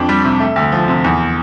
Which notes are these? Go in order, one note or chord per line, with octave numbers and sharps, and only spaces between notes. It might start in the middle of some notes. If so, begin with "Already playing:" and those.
Already playing: F2 D4
G3
C3
A3
D2
F3
C3
E2